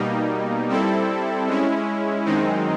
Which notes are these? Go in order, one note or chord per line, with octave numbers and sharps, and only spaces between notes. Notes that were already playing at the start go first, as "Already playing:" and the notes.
Already playing: B2 G3 A#3 D#4
G3 C4 E4 A4
G#3 C#4 E4
F#2 D#3 G#3 C4 D#4